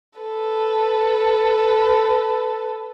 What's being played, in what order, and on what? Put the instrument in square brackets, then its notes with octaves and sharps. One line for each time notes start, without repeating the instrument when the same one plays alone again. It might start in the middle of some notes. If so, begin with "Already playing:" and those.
[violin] A4 B4